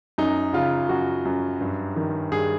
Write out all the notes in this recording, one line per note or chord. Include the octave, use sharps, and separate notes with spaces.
F#2 D#4
C#3 F4
F#2 F#4
F#2
G2
D#3
G2 G#4